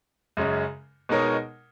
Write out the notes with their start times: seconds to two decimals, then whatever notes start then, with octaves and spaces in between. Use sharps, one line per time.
0.37 F#2 C#3 G#3 C#4
1.09 B2 G#3 D#4 A#4 C#5